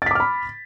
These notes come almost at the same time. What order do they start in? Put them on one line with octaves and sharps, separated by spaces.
A6 B6 D6 F6 B5